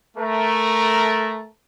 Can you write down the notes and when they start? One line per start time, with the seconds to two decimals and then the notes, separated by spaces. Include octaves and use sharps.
0.17 A3 A#4